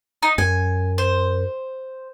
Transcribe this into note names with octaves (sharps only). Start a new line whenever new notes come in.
D#4
F#2 G#5
C5